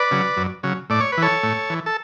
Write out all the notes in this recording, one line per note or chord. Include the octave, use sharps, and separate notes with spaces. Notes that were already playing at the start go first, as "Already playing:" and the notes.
Already playing: B4 D5
C#3 F#3
F#2
C#3 F#3
A2 D5
C#5
B4
E3 A4 C#5
A2
E3
A4